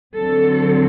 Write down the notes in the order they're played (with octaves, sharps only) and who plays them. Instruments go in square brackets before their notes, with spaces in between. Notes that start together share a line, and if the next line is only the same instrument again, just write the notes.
[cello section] D3 F#3 C4 A4